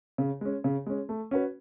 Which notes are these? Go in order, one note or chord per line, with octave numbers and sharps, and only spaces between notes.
C#3
G#3 C#4
C#3
G#3 C#4
A3
C#4 F#4 B4